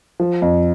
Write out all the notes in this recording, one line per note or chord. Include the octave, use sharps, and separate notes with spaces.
F3
F2